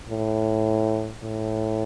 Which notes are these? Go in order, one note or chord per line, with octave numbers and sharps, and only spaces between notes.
A2
A2